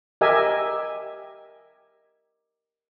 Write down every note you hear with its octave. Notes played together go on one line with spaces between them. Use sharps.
G4 A#4 D#5 E5 G#5 E6